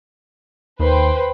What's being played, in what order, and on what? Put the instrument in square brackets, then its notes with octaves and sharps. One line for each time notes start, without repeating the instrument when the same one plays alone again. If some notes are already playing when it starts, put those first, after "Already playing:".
[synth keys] D#2 [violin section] B4 C5 G5